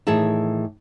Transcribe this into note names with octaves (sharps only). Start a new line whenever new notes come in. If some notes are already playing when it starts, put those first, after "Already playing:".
A2 D#3 E3 G#4 E5 A5